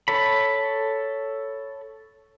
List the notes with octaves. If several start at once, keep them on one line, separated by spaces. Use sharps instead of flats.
A4 C#5 B5